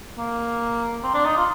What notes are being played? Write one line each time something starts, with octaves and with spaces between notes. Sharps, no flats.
A#3
C4
D4
D#4
F4